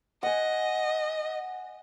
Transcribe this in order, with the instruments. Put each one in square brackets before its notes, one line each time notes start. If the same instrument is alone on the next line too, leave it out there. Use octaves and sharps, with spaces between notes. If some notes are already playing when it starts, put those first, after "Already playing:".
[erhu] D#5 [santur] F#5 G#5